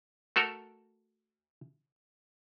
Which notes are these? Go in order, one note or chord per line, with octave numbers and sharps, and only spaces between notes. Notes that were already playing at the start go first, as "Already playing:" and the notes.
A3 F#4 A4 A#4